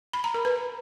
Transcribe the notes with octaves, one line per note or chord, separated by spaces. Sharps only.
B5
A#5
A#4
B4